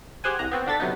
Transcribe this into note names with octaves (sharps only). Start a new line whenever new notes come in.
G4 G#4 C5 F#5 G#5
C2 A#5 F#6
B3 C4 F#4
D3 D4 A4 A6 B6
C3 F#3 B3 D#4